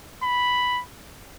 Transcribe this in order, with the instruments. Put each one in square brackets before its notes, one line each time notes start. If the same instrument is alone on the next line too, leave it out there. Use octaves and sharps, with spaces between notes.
[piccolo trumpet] B5